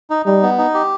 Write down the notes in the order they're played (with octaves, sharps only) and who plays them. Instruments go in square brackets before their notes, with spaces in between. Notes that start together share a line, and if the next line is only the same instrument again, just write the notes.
[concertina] D#4
[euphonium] G3 [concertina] D#4
[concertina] B3
D#4
G4